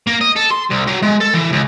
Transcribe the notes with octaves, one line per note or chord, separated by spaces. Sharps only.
A#3
D#5
A4
C6
C2
F#3
G#3
A4
E3
C#2